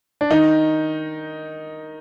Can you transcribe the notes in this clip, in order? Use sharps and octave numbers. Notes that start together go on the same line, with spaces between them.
D4
D#3 D#4